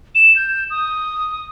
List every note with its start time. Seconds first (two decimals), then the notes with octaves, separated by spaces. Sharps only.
0.15 E7
0.36 G6
0.70 D#6